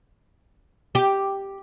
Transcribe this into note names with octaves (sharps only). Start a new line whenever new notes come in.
G4